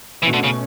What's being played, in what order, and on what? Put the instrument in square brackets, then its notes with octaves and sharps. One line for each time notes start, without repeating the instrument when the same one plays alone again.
[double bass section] B2 A3 C#4 [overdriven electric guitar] E3
[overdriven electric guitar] D3
C#3